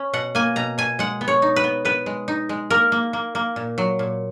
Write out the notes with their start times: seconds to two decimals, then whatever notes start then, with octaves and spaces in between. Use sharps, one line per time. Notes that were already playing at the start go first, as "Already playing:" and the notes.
Already playing: C#4
0.13 B2 F#5
0.35 A#3 G#5
0.56 B2 A#5
0.78 B2 G#5
0.99 G#3 F#5
1.21 B3
1.28 C#5
1.42 D#4
1.56 B4
1.64 B3
1.85 B3 B4
2.06 G#3
2.28 D#4
2.49 G#3
2.70 A#3 A#4
2.92 A#3
3.13 A#3
3.35 A#3
3.56 A#2
3.78 F#3
3.99 A#2